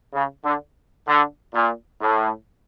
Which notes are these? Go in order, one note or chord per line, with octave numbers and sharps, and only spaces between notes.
C#3
D3
D3
A#2
A2